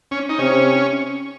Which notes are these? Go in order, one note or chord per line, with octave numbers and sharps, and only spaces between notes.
C#4
D#4
C3 C#4